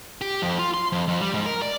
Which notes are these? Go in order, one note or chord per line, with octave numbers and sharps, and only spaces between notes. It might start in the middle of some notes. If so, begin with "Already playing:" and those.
G4
F2
F4
C6
F2
F2
G3
G#2
A#4
D5